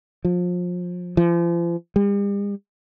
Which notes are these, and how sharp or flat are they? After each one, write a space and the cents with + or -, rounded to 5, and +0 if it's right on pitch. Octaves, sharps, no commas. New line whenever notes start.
F3 +30
F3 -40
G3 +45